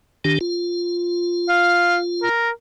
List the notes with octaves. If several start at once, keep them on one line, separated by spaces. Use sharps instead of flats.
D#3 D4 G4
F4
F5
A#4